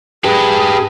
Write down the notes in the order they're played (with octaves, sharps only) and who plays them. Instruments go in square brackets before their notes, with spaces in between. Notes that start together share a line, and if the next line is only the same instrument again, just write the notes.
[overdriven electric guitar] G4 B4 [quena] G#4